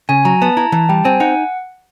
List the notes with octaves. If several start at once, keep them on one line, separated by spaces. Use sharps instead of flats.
C#3 G#5
F#3 A#5
B3 A5
E4 A#5
E3 A5
G3 G5
C4 G#5
D#4 F#5